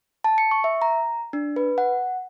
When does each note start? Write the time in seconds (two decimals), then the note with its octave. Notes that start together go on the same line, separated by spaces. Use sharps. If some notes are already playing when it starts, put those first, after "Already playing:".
0.24 A5
0.38 C#7
0.51 C#6
0.64 E5
0.82 A#5
1.33 D4
1.56 B4
1.78 F#5